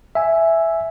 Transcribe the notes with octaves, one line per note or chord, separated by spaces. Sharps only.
E5 G#5